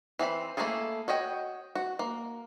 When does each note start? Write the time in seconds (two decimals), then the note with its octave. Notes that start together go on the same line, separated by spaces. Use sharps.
0.19 E3 C4 G#4 B5
0.57 A3 A#3 E4 G#4 A4
1.08 F#4 C#5 D#5 G5
1.75 F#4
1.99 A#3